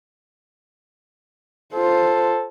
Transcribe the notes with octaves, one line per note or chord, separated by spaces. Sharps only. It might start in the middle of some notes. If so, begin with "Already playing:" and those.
F4 A4 C5